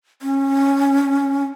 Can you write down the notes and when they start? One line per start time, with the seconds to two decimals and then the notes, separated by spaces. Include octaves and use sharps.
0.22 C#4